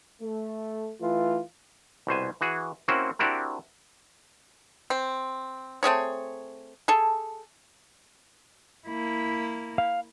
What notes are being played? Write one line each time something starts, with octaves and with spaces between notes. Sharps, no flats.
A3
E3 A3 F4
C2 B2 C5 G#5
E3 F#4 G#4
A#3 C4 C#4 E4 F#4 C5
C4 D4 E4 F#4 G4 A#4
C4
A3 C4 G#4 C#5
G#4 A4
A#3 E4
F5